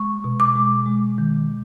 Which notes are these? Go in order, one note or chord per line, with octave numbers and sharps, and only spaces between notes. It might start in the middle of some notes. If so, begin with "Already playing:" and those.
Already playing: G#3 C#6
B2
D6
G#3
G#3
D#3